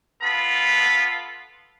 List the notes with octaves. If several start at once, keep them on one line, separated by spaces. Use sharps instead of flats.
B3 F4 A4 B5